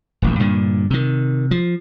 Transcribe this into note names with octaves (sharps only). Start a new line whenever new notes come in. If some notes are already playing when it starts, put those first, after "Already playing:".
D#1 A1 D#2
G2 A#2 D3
C3 D#3
F3